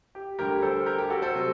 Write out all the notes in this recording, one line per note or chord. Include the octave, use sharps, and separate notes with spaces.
G4
D2 D3 G3 G4 A#4
A4 C5
G4 A#4
G4
F#4 A4
A4 C5
C3 F#3 A3